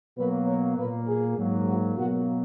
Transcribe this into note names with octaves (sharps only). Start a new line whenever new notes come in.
B2 F#3 A#3 B4
C#5
A#2 A#3 B4
G#4
G#2 F#3 A#3
F#4
B2 F#3 A#3 F#4